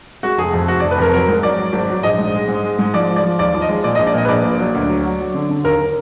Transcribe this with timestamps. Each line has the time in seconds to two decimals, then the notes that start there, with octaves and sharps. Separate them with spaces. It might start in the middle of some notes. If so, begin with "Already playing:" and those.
0.23 G#3 F#4
0.38 F1 G#4
0.53 F2
0.68 F1 F#4
0.80 F1 D5
0.91 B4
0.98 F2 A#4
1.13 F#3 A#4
1.28 G#2
1.43 F#3 D5
1.58 F#3
1.73 G#1
1.89 F#3
2.03 A#1 D#5
2.18 G#2
2.34 G#3
2.48 G#2
2.64 G#3
2.79 G#2
2.94 F3 D5
3.09 F3
3.16 D5
3.24 F3
3.39 D#2 D5
3.54 F3
3.62 D#5
3.69 G#3
3.84 A#2 D5
3.95 A#1 D#5
4.07 D5
4.14 A#2 D#5
4.25 B4
4.29 A#1 D5
4.44 A#2
4.59 F#3
4.74 D2
4.89 F#3
5.04 F#3
5.20 F#3
5.34 D3
5.49 D3
5.64 D#2 A#4